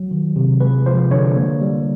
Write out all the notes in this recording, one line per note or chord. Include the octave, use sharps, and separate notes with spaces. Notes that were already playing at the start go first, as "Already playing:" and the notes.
Already playing: F#3
D#3
C3
G#3 B4
F3 C5
D3 C#5
A#3
G3